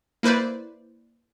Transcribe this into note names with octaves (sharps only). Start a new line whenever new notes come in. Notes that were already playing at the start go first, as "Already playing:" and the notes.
A#3 E4 B4 C5 D5